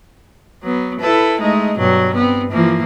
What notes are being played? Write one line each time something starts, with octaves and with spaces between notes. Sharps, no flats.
F#3 B3
E4 A4 B4
G#3 A3 D#4
G2 B2 F#3
B3 C4
E3 F3 A#3